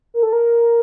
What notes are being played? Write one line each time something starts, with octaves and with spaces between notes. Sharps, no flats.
A#4
A4
A#4